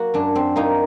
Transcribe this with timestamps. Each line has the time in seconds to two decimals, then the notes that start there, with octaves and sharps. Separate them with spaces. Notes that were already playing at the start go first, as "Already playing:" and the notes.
Already playing: F#3 A#3 F#4
0.14 F#2 D4
0.35 C4
0.56 F#3 A#3 D#4